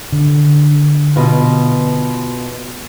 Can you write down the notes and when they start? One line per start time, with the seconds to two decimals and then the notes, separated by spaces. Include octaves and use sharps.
0.12 D3
1.16 B2 F4